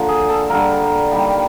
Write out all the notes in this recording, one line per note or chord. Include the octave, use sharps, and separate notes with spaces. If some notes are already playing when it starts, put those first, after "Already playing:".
Already playing: D3 F3 A#3
G#4
A4
D3 G3 A#3 A#4
D#3 G3 A#3